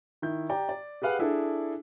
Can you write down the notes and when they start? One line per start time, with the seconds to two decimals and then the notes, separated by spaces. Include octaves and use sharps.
0.22 D#3 E4 G6
0.49 G4 D5 G5 A#5
0.69 D5
1.02 G4 G#4 B4 F5 F#5
1.19 D4 E4 G#4 A4